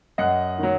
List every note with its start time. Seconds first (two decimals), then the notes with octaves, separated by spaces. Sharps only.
0.18 F#2 D#5 F#5
0.58 D#3 F#3